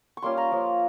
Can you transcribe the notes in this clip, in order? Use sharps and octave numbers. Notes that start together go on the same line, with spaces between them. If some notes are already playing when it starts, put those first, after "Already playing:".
C#6
G3 A#3 C#4 F4 C6
A#5
F3 A#3 C#4